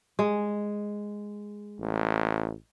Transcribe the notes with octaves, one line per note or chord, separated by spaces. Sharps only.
G#3
A1